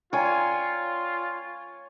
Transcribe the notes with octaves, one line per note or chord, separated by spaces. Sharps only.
F4 C#5 D5 G5 G#5 A#5